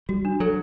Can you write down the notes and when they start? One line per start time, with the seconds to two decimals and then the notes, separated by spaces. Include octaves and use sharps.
0.09 G3 F#4
0.25 D4
0.40 F#3 A4